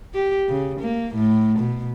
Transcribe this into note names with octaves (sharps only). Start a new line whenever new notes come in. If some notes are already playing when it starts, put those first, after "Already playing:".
G4
C#3
A#3
A2
B2